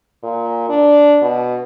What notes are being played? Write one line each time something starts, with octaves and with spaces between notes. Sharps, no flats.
A#2
D4
B2